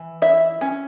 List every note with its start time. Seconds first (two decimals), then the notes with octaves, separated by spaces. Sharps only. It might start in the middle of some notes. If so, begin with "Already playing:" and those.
Already playing: E3
0.22 E4 E5
0.61 C#4